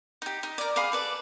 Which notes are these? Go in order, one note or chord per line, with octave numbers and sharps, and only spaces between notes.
D#4 G4
D#4
A#4 D5
G#4 F5 B5 D6
A4 B4 D5